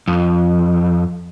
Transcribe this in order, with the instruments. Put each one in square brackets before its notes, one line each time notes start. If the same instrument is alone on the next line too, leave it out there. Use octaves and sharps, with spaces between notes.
[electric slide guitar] F2